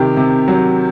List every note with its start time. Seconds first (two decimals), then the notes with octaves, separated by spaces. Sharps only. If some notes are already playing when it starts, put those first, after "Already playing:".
Already playing: C3 D#3 G4
0.17 C3
0.48 F#3